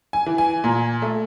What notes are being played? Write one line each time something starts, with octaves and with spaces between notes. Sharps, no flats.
G#5
E3
G#5
A#2
A3